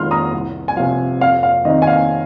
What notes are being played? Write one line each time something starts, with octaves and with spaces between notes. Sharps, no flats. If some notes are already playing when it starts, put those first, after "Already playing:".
Already playing: F2 D#3 G#3 F4 C6 F6
A#5 D#6
C2
G#5
C3 F3 F5
F2 F5
F5
D#3 C4 D#4 D#5
G#5
F5